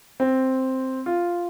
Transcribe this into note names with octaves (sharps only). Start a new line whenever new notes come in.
C4
F4